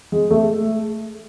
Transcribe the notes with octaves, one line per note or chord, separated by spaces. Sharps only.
G#3
A3